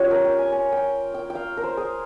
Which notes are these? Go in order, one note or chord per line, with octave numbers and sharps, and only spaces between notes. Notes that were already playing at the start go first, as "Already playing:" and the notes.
Already playing: C#4 F4 G4 C#5
A#4
G5
G#5
G#5
G5
G5
G5
F5
A#4
C5
G#4